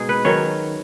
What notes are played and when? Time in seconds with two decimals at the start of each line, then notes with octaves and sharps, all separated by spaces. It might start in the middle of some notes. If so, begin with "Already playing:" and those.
Already playing: B2 G#3 D#4 G#4
0.09 B4
0.25 D#3 F#3 C#4 C#5